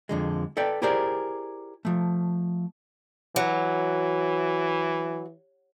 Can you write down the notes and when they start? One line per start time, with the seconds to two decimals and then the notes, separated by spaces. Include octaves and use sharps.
0.09 F2 D3 G#3
0.57 A4 B4 D5 G5
0.82 E4 G4 G#4 A#4 C5 D5
1.85 F3 A3
3.36 E3 F#3